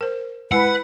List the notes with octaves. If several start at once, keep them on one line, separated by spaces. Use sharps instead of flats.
A#4 C5
G#3 E4 B4 F#5 G#5